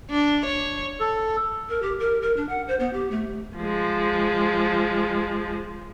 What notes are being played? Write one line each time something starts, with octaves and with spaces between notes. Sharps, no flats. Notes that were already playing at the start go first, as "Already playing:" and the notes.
D4
C#5
A4
A#4
G4
A#4
A#4
D4
F#5
C5
B3
G4
A3
F3 G#3